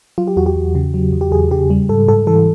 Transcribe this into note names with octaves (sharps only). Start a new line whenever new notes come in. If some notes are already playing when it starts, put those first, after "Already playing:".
F#3 F4
G4
E2 F#4
G4
E2
C#3
F#3
E2
G4
E2 G#4
C#3 G4
G3
G#2 A4
G#2 A4
E3 A4